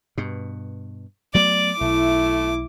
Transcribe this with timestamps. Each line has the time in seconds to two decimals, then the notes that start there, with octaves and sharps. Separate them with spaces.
0.18 G2 B2
1.34 F#3 A3 B3 D5 D6
1.81 B1 A3 E4